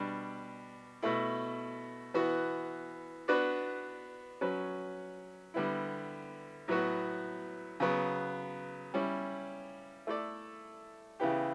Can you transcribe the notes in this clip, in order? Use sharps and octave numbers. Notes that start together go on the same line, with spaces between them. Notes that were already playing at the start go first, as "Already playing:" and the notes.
Already playing: B2 G3 D4
B2 A3 E4
E3 B3 F#4
B3 D4 F#4 B4 D5
F#3 C#4 F#4 B4
D3 G3 B3 E4
A2 F#3 B3 F#4
C#3 F#3 B3
G3 C#4 E4
A3 E4 A4 D5
C#3 E3 B3 E4 G4